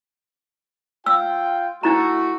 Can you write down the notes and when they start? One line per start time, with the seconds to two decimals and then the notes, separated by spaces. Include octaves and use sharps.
1.06 F4 G5 E6
1.83 A3 D4 E4 F#4 A#5